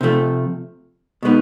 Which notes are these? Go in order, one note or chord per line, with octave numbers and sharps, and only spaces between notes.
C3 F3 A3
B2 G#3 B3 D#4